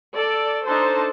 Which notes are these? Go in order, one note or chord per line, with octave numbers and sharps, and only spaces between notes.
A4 D5
D4 D#4 A4 C5 A5